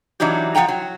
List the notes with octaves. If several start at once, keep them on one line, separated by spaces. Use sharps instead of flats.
E3 F#3 D4 D#4 G4
F3 C4 F#5 G5 A#5
F#3